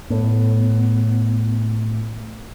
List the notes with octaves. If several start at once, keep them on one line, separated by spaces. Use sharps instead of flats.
A2 B3